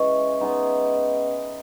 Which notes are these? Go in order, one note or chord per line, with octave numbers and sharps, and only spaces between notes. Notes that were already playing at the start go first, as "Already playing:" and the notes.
Already playing: E3 G#3 C#4
G#3 B3 D#4